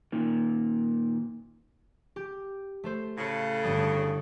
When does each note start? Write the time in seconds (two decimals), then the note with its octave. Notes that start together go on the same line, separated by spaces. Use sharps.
0.12 A#2 D#3
2.16 G4
2.84 A3 A4 C5
3.18 A2 C#3
3.63 G1 G3 D#6